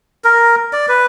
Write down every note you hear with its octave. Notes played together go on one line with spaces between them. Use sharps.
A#4
D5
B4